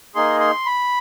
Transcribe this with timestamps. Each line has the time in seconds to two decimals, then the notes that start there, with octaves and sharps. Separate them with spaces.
0.15 A#3 D#4 G#4 C6
0.40 C6
0.66 B5